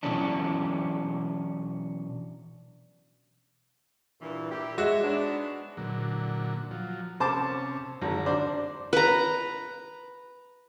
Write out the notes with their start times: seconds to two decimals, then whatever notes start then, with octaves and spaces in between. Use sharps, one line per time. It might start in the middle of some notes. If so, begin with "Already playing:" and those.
0.03 B2 E3 F#3 C#4 D4
4.21 G2 A#2 E3
4.51 A#2 E4 G4
4.78 G#3 F#4 C#5 E5
5.03 G#2 B3 D4
5.77 A#2 D3 F#3
6.71 F3 F#3
7.20 C3 C#4 C5 A5 D6
8.02 G#1 F#2 D3 A#5
8.26 D4 C5 D5
8.93 B4 A#5